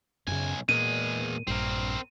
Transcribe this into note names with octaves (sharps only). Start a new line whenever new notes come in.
B1 F#2 C#3 G#5
E2 A#2 G#3 D#7
A#1 G2 C4 A#4